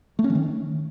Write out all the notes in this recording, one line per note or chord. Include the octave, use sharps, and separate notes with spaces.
A3
C#4
E3
D#3